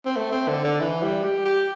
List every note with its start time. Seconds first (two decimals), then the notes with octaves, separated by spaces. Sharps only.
0.06 C4
0.16 A3
0.32 C4
0.48 D3
0.64 D3
0.80 E3
1.02 G3
1.24 G4
1.45 G4